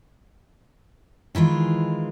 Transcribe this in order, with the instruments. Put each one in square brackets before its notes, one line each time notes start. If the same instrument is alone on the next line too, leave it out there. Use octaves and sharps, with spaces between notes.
[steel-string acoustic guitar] D#3 E3 G#3 F4